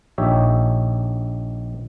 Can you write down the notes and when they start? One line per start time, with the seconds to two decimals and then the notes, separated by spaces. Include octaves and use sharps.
0.18 A#1 D#4 G4 C#5 E5